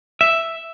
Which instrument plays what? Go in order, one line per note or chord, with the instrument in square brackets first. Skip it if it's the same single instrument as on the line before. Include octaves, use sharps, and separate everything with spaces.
[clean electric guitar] E5